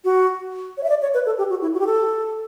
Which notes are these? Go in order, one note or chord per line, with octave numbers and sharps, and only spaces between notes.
F#4
C#5
E5
D5
C#5
B4
A4
G4
F#4
E4
F#4
G4
A4